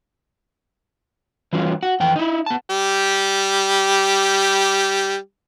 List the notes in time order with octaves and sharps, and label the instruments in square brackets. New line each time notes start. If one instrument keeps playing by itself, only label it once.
[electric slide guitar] E3 F#3 G3 C#4 F4
F#4
F2 E3 G5
D#4 E4
B3 A5
[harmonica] G3 G4